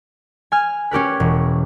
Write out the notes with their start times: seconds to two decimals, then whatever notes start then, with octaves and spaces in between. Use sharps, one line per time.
0.52 G#5 F6
0.91 C#4 G4 A#4 B4
1.20 E1